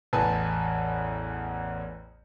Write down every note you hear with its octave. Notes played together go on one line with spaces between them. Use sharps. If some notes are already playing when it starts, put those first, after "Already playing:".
A1 E2 B4 G#5 A5